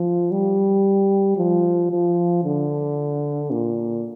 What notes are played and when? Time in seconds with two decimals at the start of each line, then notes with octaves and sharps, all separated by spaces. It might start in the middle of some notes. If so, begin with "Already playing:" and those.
Already playing: F3
0.31 G3
1.37 F3
1.92 F3
2.44 D3
3.51 A#2